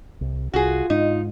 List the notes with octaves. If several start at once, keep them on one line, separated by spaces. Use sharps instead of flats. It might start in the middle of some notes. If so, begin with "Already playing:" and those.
C2
C2 F4 F#4 G#4
G#2 D#4